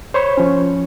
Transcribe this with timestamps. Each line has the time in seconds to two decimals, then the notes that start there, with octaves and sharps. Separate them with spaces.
0.14 C5 C#5 B5 C#6
0.38 F3 C#4